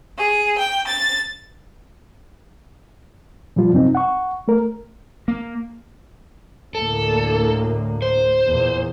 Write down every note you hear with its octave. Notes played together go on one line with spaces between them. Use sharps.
G#4
G5
A6
A#2 F3 G3 F4
F#2 C3 C4 D#4
F#5 C#6
A3 A#4
A#3
D2 A2 A#3 A4
C5
E2 A#2